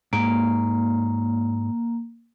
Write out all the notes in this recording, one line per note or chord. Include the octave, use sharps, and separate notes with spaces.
G#2 A#3